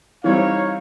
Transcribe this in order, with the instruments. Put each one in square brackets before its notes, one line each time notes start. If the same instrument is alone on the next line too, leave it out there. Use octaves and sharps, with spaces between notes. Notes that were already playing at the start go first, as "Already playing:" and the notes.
[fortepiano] E3 G3 C4 [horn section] D#4 C#5 [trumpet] F5